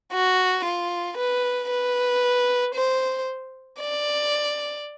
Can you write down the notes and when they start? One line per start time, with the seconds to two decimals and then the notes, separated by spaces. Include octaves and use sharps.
0.12 F#4
0.65 F4
1.17 B4
1.70 B4
2.75 C5
3.80 D5